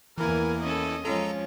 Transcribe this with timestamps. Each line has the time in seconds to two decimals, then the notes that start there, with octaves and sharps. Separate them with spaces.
0.18 E2 E3 A#3 E4 A#4 G#5
0.61 C#4 A4 D#5
1.05 F3 G#3 C#4 F4 A4 A#5